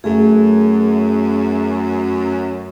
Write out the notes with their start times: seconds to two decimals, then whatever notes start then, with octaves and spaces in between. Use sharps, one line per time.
0.04 F#2 A3 G#4